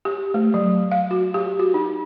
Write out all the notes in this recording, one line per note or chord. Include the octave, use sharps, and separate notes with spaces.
G4
A3
F#3
F5
F#4
G4
F#4
D#4